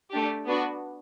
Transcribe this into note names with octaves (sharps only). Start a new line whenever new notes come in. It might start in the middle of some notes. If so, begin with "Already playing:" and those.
A3 D4 G4
B3 D4 F#4